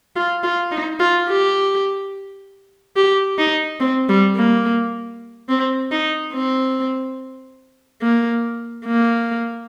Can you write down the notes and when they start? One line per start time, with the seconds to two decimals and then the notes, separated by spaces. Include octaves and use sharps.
0.16 F4
0.43 F4
0.71 D#4
0.99 F4
1.29 G4
2.96 G4
3.38 D#4
3.80 C4
4.09 G3
4.36 A#3
5.49 C4
5.91 D#4
6.33 C4
8.01 A#3
8.85 A#3